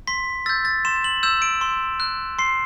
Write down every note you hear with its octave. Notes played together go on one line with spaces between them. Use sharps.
C6 B6
E6 G6 A6
A6
C6 E7
F#7
E6 G6 E7
D7
C6
F#6
C6 C7